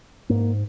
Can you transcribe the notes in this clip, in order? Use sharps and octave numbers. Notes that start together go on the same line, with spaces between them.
G#2 A#3